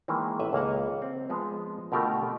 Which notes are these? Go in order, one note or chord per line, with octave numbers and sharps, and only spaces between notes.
D#3 E3 G#3 A#3
A1 B4 E5
C#2 A#3 F5 F#5
C4
F3 G#3 B3
B2 D3 A3 F4 G4 A#4